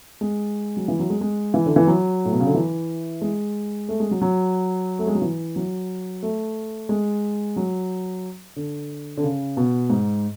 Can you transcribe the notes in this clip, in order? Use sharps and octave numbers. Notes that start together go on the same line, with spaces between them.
G#3
F#3
E3
F#3
G#3
G#3
E3
D3
E3
F#3
A2
B2
C#3
D3
E3
G#3
A3
G#3
F#3
F#3
A3
G#3
F#3
E3
F#3
A3
G#3
F#3
D3
D3
C#3
B2
G#2